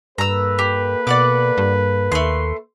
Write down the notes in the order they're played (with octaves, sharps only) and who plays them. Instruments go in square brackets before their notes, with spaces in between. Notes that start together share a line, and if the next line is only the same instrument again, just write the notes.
[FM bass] G2 [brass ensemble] A#3 A4 B4 [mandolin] A#5 E6
[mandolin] G4
[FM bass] B2 [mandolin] D5 F#5 D6
[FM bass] G2
[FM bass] D#2 [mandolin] A3 C6